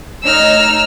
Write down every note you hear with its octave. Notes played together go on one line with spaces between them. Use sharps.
A3 D#4 C#5 E6 F6